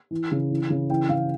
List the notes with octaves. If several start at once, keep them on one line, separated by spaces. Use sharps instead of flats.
E3
C#3
E3
C#3
E3 G5
C#3 F5